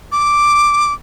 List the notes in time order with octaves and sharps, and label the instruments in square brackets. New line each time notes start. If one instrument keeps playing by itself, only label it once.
[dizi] D6